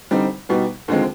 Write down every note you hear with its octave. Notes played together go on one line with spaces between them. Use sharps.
D3 G3 C4 D#4
B2 G3 B3 D#4
D#2 D3 F3 G#3 C4